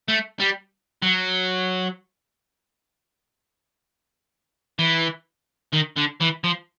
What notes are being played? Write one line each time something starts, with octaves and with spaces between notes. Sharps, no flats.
A3
G3
F#3
E3
D#3
D3
E3
F3